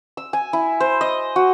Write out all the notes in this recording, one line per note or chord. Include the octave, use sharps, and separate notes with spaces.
E6
G#5
E4
C5
D#5
F#4